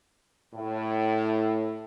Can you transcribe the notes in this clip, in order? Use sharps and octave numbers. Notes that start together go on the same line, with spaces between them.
A2